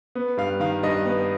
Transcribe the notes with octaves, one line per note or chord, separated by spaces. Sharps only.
B3
G2 F5
D#3 F5
G2 D#5
B3